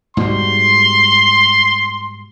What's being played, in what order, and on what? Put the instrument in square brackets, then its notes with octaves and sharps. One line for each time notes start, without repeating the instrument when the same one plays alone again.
[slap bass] G#2 B2 G3 [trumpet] C6